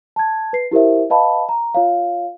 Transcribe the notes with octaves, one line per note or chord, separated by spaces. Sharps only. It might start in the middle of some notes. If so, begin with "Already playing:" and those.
A5 G#6
B4 C7
E4 G4 A#4 C5 E5
B4 D#5 F5 A5 B5
A#5
F4 C#5 F5